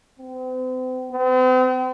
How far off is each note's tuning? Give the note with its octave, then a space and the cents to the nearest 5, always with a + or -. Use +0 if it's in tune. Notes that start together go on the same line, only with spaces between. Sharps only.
C4 -40
C4 -45